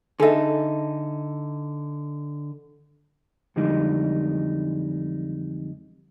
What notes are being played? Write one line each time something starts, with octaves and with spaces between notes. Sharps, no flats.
D3 D#4 G#4 A4 E5
F2 D3 E3 G3 G#3 D#4